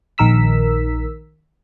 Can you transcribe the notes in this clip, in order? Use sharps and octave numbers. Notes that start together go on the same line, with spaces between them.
A#1 D#3 A#4 E6 B6